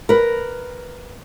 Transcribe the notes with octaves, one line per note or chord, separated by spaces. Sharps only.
A#4 B4